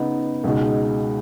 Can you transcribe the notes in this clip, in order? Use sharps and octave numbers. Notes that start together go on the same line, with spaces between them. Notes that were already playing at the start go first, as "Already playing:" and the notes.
Already playing: C#3 B3 D#4
C#2 B2 G#3 D#4